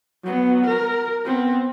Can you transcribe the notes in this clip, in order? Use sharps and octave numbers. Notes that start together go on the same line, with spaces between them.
F#3 B3
A#4
B3 C4